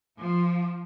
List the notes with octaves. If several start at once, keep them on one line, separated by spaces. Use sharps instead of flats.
F3